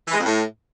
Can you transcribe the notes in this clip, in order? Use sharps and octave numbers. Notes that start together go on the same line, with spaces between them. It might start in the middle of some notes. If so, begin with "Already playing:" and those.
E3
G#3
F2
A2